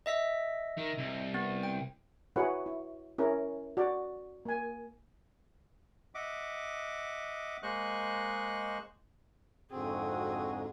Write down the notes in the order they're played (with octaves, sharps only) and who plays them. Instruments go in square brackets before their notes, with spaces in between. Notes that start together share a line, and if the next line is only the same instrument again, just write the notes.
[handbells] D#5 E5 B6
[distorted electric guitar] D#3
C2
[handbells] B3
G5
[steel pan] E4 F#4 G#4 B4 C#5 F#5
E4
C#4 E4 G#4 A#4
F#4 D5
A#3 G#5
[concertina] D#5 E5 F#5 D6
G#3 A#3 C5 D#5 C#6 F#6
[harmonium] F2 G#2 D3 [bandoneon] C4 [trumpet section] F#4 [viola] G#4